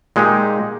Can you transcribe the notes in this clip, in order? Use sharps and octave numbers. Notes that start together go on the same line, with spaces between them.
A#2 G#3 D#4 G4